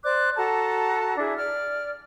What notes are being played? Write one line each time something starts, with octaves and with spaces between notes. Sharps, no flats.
C5 D5 D6 F#6
F#4 A4 A5 A#5
D4 E4 G#4
D5 F6